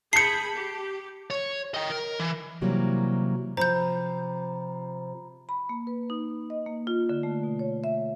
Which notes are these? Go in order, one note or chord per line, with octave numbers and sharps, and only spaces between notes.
G#4 A5 B5 G6 C7 C#7
G4
C#5
D#5 G5
A#4
E3
C3 E3 F#3 G3 A#3
C3 F3 C5 A#5 B5 G6
B5
A#3
B4
D#4
D#5
A#3
F4
D3
A3
B2
C#5
E5